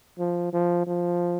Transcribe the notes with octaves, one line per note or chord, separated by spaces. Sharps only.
F3
F3
F3